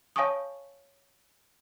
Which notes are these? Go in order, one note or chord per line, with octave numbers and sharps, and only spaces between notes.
C#5 F5 G#5 A5 C#6 D#6